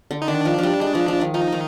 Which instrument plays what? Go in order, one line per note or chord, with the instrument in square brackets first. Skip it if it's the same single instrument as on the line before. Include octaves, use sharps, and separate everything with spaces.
[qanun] D3
[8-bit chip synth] D#4
[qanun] D#3 [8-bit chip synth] D4
[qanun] F3
F3 G3
G#3
F3
F3
D#3
[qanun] F3 [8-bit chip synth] D#4
[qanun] D#3